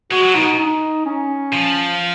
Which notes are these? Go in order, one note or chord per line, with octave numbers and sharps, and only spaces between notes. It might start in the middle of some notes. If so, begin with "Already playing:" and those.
G#3 F#4
F#3
B2 D#4
D#4
C#4
F3